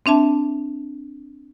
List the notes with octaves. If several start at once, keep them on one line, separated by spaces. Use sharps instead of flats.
C4 D4 E5 A5